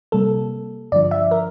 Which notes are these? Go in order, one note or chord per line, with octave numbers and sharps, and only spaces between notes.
C3 G3 A#3 A4
G2 D3 F3 D5
E5
A#4